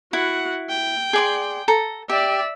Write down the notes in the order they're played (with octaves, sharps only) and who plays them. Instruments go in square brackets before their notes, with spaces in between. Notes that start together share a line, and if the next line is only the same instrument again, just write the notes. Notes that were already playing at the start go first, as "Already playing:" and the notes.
[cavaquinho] E4 [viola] F#4 F#5
[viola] G5
[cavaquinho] G#4 D5 C6
A4 A#5
[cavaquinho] G4 [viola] D5 E5